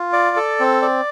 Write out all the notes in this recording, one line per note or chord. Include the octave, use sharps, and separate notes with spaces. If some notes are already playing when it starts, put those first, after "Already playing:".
Already playing: F4
D5
A4
C4
D5